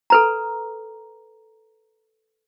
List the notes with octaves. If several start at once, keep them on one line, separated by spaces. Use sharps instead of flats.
A4 B4 A#5